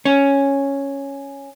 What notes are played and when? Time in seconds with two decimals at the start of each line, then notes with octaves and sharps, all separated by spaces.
0.05 C#4